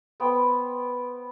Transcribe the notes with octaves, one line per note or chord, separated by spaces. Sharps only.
B3 C5 G5